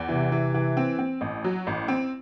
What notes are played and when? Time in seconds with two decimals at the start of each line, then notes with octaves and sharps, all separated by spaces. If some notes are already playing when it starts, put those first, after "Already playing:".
Already playing: E2
0.09 C3 E3
0.32 E3
0.54 E3
0.77 C4
0.98 C4
1.21 A1
1.44 F#3
1.67 A1
1.88 C4